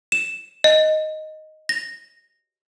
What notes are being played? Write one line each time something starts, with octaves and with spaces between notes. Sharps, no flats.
E7
D#5
A#6